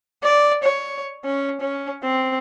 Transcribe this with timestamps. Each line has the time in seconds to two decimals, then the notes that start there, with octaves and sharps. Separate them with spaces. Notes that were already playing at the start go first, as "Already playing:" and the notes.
0.24 D5
0.64 C#5
1.24 C#4
1.61 C#4
2.03 C4